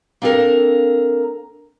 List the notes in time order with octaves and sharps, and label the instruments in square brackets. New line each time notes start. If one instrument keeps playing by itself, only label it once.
[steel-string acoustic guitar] A#3 C4 D4 A4 A#4